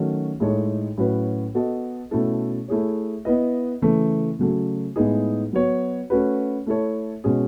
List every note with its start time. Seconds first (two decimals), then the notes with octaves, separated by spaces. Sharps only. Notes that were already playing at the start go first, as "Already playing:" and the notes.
Already playing: D#3 F#3 A3 C#4 F#4
0.40 A2 G#3 D#4 A4 C#5
0.98 A2 F#3 C#4 F#4 B4
1.54 B3 F#4 A4 D#5
2.11 B2 A3 C#4 E4 A4
2.68 A3 E4 G#4 C#5
3.25 B3 E4 B4 D#5
3.82 C#3 E3 A3
4.39 C#3 F#3 A3
4.96 A2 G#3 B3 D#4 G#4
5.53 F#3 B3 F#4 C#5
6.10 A3 C#4 F#4 B4
6.67 A3 E4 A4 C#5
7.24 B2 G#3 C#4 G#4